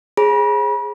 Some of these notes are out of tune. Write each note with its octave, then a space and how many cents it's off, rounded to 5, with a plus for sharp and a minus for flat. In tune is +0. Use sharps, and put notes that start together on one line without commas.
G#4 +0 C5 +40 B5 -40